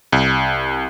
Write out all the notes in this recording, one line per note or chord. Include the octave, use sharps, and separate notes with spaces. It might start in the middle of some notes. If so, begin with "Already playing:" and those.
C2